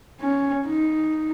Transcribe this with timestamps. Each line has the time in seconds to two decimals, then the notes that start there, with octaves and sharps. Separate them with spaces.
0.20 C#4
0.66 D#4